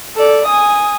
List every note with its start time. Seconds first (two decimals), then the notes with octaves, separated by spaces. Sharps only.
0.16 A4 D5
0.47 G#5 D#6